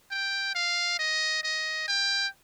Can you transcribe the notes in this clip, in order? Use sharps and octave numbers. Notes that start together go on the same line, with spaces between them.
G5
F5
D#5
D#5
G5